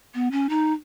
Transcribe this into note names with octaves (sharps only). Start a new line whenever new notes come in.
B3
C#4
D#4